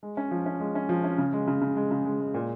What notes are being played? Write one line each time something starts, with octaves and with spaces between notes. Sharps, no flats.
G#3
C#4
F3
C#4
G#3
C#4
F3
C#4
C#3
G#3
C#3
C#3
G#3
C#3
G#3
G#3
A#2